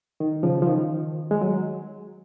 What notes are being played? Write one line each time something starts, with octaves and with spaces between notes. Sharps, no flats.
D#3
C#3 F3
F3
D#3
G#3
F#3